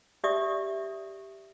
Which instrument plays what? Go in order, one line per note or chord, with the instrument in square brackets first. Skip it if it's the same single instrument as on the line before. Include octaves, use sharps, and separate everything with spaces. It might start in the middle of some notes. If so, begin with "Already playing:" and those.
[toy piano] G4 D5 E5 D#6